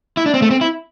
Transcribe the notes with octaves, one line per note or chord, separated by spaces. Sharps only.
E4
D4
C4
A3
C4
E4